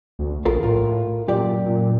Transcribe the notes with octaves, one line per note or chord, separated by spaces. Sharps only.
D2
A#1 F4 A4 A#4
A2 F4 A#4
F#2 A#2 G4 D5
A#2